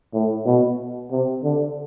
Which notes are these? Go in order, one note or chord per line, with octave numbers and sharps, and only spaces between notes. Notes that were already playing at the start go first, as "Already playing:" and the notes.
A2
B2
C3
D3